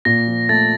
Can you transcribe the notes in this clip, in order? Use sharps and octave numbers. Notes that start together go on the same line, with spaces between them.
A#2 A#6
F3
A3 A6